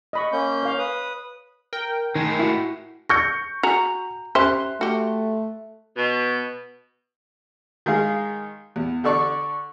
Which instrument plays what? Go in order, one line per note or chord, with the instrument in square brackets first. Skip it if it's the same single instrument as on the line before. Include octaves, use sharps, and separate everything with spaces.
[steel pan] D#5 B5 C#6
[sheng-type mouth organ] A#3 C#4 G6
[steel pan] C#5 F5
[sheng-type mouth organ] B4 D#6
[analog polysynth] A#4 G5
[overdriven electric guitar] A2 G#3 [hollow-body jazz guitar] D#3
[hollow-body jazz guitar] E4 F#4
[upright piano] C#6 G6 C#7 [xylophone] A#6
[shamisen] F#4 G#4 [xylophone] A#5
[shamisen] C#4 G4 C5 [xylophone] E5 [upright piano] C6 F#6
[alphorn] A3 [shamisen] F#4 G4
[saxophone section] B2
[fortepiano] D#3 G#3 G#4 F5
E2
D3 A4 D5 C#6 D6